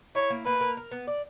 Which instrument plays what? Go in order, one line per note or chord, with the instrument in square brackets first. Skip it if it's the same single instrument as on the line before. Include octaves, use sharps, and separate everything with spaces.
[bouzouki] E4 [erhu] C#5
[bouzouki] A#3
[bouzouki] A#3 [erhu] B4
[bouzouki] A#4
A#4
B3
D5